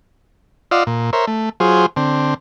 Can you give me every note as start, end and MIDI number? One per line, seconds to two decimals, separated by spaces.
0.71 0.84 65
0.71 0.84 74
0.71 0.84 75
0.71 0.84 77
0.71 0.84 78
0.71 0.84 88
0.87 1.10 46
1.13 1.25 70
1.13 1.25 72
1.13 1.25 73
1.13 1.25 76
1.27 1.49 57
1.60 1.86 54
1.60 1.86 65
1.60 1.86 68
1.60 1.86 72
1.96 2.34 50
1.96 2.34 60